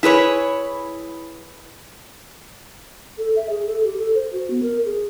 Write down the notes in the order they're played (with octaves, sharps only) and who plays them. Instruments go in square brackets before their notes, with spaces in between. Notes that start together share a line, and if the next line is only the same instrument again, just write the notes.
[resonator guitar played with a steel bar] E4 G#4 B4 C#5
[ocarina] A4
E5
G#4
A4
G4
A4
C5
F#4
B3
A#4
G#4